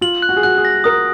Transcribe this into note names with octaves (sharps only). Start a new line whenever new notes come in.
F4 F#7
F#6
F#4
G#4
F#4 F#6
G#4
A#6
A#4 D#6